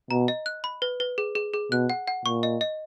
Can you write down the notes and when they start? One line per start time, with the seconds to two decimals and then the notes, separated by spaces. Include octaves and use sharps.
0.11 B2 A#5
0.28 D#5
0.46 F#6
0.64 B5
0.82 B4
1.00 B4
1.18 G#4
1.35 G#4
1.54 G#4
1.71 B2 F#6
1.90 F#5
2.08 F#5
2.25 A#2 C#6
2.43 D#5
2.61 D#5